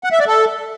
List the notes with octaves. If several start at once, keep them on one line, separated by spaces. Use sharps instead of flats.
F#5
E5
D5
A4